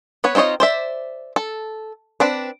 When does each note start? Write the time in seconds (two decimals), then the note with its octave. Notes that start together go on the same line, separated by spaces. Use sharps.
0.24 B3 B4 C#5
0.35 C4 D#4 F4 C#5 D#5
0.60 C5 D5 E5
1.36 A4
2.20 C4 D4 B4